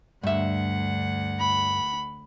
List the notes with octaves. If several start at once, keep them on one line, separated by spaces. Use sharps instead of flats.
D2 G2 E5 F#5
B5